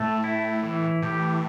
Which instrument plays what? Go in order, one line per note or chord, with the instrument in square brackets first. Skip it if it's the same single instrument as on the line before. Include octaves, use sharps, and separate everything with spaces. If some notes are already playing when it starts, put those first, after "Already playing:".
Already playing: [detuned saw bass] A2 [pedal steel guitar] A3 A4
[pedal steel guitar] E4
E3
[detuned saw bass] A2 [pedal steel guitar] G4